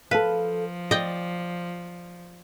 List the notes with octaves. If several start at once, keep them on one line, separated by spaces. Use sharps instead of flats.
F3 A4 B4 F5
D5 D#5 G5